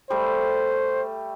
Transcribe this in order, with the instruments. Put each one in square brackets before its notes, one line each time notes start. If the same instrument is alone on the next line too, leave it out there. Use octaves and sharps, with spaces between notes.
[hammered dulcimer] G3 A3 [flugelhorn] C5